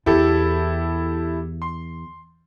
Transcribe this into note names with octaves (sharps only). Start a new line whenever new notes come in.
E2 E4 G4 A4
C6